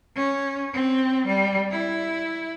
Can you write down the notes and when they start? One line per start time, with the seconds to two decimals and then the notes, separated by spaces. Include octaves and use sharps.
0.15 C#4
0.74 C4
1.27 G3
1.71 E4